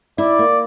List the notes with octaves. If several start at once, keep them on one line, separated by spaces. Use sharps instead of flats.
E4 D5
A#3